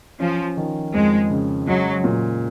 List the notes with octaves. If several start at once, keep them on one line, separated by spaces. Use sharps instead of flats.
F3 C#4
D#3
F2 G#3
C#3
F#3 G#3
A#2